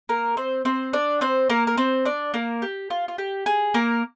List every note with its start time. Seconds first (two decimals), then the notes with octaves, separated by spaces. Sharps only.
0.09 A#3 A#4
0.37 C4 C5
0.65 C4 C5
0.93 D4 D5
1.21 C4 C5
1.50 A#3 A#4
1.67 A#4
1.77 C4 C5
2.05 D4 D5
2.34 A#3 A#4
2.62 G4
2.90 F4
3.08 F4
3.18 G4
3.46 G#4
3.74 A#3 A#4